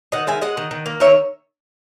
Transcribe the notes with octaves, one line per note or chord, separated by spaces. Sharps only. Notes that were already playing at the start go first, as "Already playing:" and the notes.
D#3 D#5 F#5
G#3 E5 G#5
G#3 D#5 F#5
D#3
D#3
A#3
D#3 C#5 E5